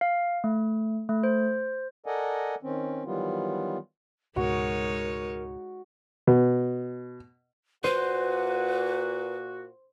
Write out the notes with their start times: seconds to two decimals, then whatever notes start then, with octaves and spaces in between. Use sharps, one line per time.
0.01 F5
0.44 A3
1.09 A3
1.23 C5
2.06 A4 A#4 D5 D#5 F#5 G#5
2.63 D#3 C4 C#4
3.05 D#3 E3 F#3 G3 B3 F4
4.36 C#2 G#2 B2 G#3 D#4 F#4 A#4 C#5
6.27 B2
7.84 A#2 F#4 B4 C5